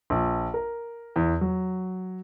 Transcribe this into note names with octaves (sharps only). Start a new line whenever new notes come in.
A#1
A#4
E2
F#3